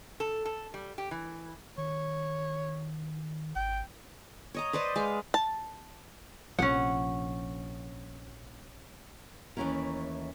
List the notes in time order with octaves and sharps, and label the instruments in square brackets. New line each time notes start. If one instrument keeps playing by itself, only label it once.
[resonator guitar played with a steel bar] A4
A4
G3
G4
E3
[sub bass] D#3 [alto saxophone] C#5
[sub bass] G#1 [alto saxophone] G5
[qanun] C#5 D#5 A#5
B4 C5 D5 D#5
G#3 B4 F5
[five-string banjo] A5
[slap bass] A#1 C3 F3 [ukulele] C#4 F#5
[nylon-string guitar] D#2 E3 A3 C#4 E4 A#4